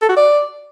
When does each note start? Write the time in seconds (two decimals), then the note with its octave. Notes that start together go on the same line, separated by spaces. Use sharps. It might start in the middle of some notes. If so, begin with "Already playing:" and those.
0.02 A4
0.09 F#4
0.16 D5